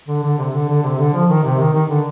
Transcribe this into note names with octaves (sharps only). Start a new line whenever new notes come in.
D3
D3
C3
D3
D3
C3
D3
F3
D#3
C3
D#3
D#3
D3